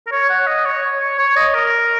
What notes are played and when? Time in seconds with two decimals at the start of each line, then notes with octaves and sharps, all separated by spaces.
0.07 A#4
0.11 C#5
0.30 F#5
0.47 D#5
0.65 C#5
1.00 C#5
1.19 C#5
1.36 D#5
1.54 A#4